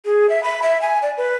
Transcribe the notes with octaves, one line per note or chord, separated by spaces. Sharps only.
G#4
E5
B5
E5
G#5
D5
B4